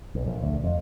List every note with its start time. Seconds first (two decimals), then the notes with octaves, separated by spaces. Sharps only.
0.15 B1
0.26 A#1
0.42 D2
0.64 F2